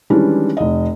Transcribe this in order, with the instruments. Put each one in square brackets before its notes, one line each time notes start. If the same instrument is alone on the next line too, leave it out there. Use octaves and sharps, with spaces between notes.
[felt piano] D#3 E3 G3 G#3 C#4 D4
F1 D#5